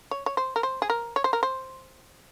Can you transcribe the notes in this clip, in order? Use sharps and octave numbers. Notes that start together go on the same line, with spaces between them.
C#5
C#5
C5
A#4
C5
G#4
A#4
C#5
C5
A#4
C5